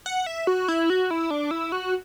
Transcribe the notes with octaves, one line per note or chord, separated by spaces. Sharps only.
F#5
E5
F#4
E4
F#4
E4
D4
E4
F#4